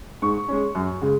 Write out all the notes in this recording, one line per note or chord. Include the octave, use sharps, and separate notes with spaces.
G#2 C#6
G#3 C#4
F#2
C#3 G#3